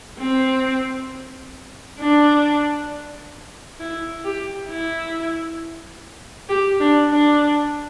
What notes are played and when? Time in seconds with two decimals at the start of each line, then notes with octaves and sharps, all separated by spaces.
0.18 C4
1.99 D4
3.79 E4
4.24 G4
4.69 E4
6.49 G4
6.80 D4
7.10 D4